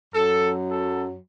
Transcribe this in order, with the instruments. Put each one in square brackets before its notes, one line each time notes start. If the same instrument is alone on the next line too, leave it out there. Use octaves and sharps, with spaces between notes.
[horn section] F#2 F#3 A4
A4